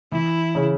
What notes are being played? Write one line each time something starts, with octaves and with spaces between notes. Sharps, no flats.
E3 E4
C#3